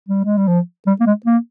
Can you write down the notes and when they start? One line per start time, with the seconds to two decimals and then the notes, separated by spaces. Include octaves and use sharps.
0.09 G3
0.25 G#3
0.37 G3
0.48 F3
0.87 G3
1.00 A#3
1.07 G#3
1.26 A#3